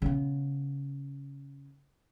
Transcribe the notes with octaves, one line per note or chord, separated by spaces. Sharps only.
C#3 B3